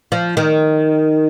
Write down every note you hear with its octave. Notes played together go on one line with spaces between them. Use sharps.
F3
D#3